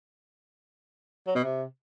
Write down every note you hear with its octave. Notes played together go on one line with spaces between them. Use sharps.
F#3
B2
C3